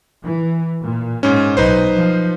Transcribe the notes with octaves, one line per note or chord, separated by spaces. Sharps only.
E3
A#2
G#2 C#4
B1 D#4 B4 C5
F3